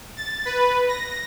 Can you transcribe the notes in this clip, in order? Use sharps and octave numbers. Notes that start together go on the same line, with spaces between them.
A6
B4
A#6